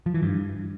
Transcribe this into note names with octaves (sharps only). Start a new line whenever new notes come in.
F3
E3
G2